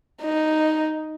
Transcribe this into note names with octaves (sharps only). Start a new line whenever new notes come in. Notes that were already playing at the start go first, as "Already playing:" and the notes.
D#4